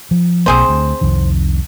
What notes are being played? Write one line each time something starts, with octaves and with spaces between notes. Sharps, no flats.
F3
B1 E2 A#3 C4 G#4 C5
D2
C2 F2 D#3